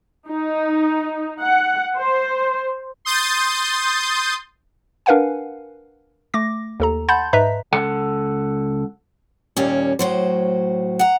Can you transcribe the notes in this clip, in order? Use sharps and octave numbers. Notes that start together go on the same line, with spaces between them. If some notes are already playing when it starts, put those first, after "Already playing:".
D#4
F#5
C5
C6 D#6 G6 A6
D4 A#4 B4 F5 F#5 G#5
A3 D6 A#6
D#2 A4 A#5
F#5 A5 B5 C6 G6 A6
G#2 B4 D#5 E5 A#5 B6
C#2 A4 F#5
D#2 A#2 G3 C#4
A2 F#3 C5
F#5 A#5